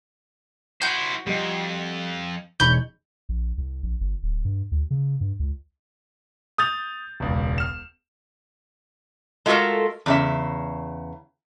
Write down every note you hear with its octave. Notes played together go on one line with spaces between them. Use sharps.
E4 F#4 C5 G6
F2 G3 D#5
E1 D#4 C#5 B5 G6
A#1
C2
A#1
G1
D1
G2
D2
C#3
G2
C#2
D#6 G6 A6 F7
E1 C#2
F6 E7
G#3 A3 F4 F#4 A4 A#4
E2 C#3 E5